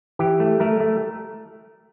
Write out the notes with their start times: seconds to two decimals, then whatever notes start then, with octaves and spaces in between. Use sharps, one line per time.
0.19 E3 G4
0.40 A3
0.60 A3 A#4
0.80 A3